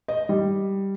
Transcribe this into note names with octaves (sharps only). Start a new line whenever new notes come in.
D#5
G3